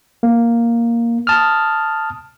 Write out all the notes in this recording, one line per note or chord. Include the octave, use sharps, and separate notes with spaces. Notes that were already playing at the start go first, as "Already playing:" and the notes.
A#3
A5 D#6 F6